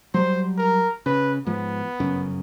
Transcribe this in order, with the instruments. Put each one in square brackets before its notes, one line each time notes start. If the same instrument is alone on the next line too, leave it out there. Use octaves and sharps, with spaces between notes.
[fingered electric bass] F#3 G3 [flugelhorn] C5
[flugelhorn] A#4
[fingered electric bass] C#3 [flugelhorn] B4
[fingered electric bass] G#2 F3 [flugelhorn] B3
[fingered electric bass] G1 F#2 C#3